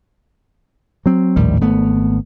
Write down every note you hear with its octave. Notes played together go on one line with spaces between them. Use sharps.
F#3 C4
A#1 D#2 A2 G3
G#1 A3 B3